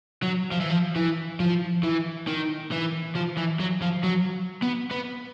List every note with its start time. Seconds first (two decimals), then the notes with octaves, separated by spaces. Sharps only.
0.23 F#3
0.51 F3
0.60 E3
0.69 F3
0.96 E3
1.40 F3
1.83 E3
2.28 D#3
2.72 E3
3.16 F3
3.37 E3
3.60 F#3
3.82 F3
4.03 F#3
4.62 B3
4.91 B3